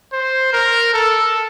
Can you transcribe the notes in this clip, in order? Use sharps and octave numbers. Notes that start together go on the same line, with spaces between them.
C5
A#4
A4